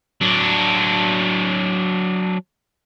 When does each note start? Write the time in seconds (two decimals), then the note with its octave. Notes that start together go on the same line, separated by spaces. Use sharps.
0.21 F#3 D4